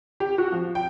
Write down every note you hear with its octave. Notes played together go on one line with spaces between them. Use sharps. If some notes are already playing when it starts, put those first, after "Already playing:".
G4
F#4
F3
G5